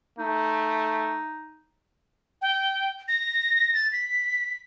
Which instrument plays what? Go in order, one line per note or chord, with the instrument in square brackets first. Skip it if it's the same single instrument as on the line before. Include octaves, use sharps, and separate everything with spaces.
[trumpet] A3 [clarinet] D#4
[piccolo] G5
A#6
A6
B6